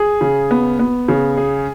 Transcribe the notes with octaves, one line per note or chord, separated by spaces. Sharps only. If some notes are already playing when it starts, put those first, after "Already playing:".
Already playing: G#4
C#3
B3
B3
C#3
G#4